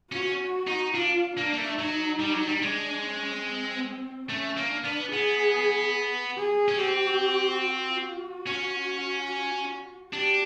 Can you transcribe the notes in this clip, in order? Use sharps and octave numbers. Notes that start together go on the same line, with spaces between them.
C#4 F#4
D#4
D4 F4
A#3 D4
A#3
A3
F#3 D#4
G3
F#3
G3
G#3 D4
C#4
C4
A3 C#4
A#3
D4
B3
B3 G#4
G#4
C#4
C4 G4
F#4
C#4
D4 G4